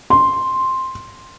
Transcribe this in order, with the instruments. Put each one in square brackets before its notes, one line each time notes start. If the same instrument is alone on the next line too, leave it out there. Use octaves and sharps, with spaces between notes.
[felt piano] C6